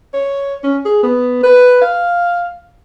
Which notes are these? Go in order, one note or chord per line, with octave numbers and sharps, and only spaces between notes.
C#5
C#4
G#4
B3
B4
F5